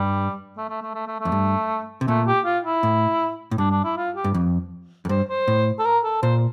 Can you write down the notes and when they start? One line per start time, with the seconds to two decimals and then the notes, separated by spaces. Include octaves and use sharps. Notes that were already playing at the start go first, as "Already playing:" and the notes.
Already playing: G2 G3
0.57 A3
0.69 A3
0.82 A3
0.95 A3
1.07 A3
1.20 A3
1.25 F2
1.32 G2
2.01 C3
2.08 A#2 A3
2.27 G4
2.45 F4
2.64 E4
2.83 A2
3.51 A2
3.58 G2 D4
3.71 D4
3.84 E4
3.97 F4
4.16 G4
4.24 G2
4.34 F2
5.05 F2
5.09 G2 C5
5.29 C5
5.48 A2
5.79 A4
5.85 A#4
6.05 A4
6.23 A#2 C5